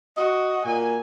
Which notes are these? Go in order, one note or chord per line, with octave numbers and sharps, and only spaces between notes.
F#4 D#5
A#2 G#5